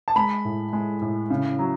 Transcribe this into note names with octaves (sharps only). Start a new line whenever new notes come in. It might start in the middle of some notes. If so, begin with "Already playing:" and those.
A5
G#3 B5
A2
G#3
A2
C#3
F#3